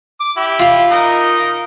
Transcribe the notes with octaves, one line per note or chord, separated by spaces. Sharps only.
D6
E4 G4
F4 F5
D#4 A#4 D#5